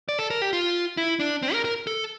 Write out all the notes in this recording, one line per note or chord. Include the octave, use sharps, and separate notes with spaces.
D5
A4
A#4
G4
F4
E4
D4
C4
A#4
A#4
A4